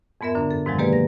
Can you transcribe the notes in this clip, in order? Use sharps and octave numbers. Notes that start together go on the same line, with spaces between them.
F2 G#2 B3 A#4 E5
F#2 D3 D4
A4
G#2 C3 D#3 F3 F#3 G#3
A#3 G4 G#4 B4 D5
A#6